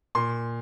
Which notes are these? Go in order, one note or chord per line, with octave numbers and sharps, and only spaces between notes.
A#2 C6